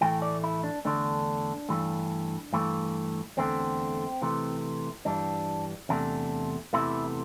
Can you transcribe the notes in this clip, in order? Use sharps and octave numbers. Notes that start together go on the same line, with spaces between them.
A2 E3 A3 G5
D5
E4
D4
E2 D3 A3 D4
G2 E3 A3
G2 E3 A3
E2 D3 A3 C4
C3 E3 A3
G2 E3 G3 D4
E2 C3 A3 D4
E2 C3 E3 A3 E4